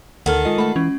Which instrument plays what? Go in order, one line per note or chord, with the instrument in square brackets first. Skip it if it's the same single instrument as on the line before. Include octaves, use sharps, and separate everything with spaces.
[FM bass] D2 [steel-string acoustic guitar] D#3 A4 [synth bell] F#5 F6
[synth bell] G#3 F4 D#5
[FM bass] A3 [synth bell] F#5 B5
[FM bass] E3 [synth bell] C#4